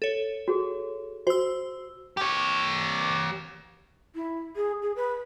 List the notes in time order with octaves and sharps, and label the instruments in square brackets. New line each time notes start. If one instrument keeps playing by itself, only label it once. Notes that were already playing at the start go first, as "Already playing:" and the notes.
[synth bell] A4 C#5
[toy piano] F#4 G#4
[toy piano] F#4 [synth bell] C5 E6
[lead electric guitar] G4 C#5
[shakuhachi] E4
G#4
G#4
B4